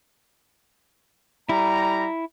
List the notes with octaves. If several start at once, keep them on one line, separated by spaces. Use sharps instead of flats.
G3 E4 A#5